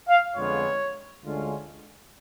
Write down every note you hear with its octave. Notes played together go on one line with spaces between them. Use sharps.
F5
F2 D3 G#3 B3 F4 C#5
D2 D3 G#3 C#4 F4